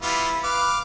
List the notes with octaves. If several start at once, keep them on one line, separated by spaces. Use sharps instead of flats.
G3 B3 E4 F4
B4 F5 D6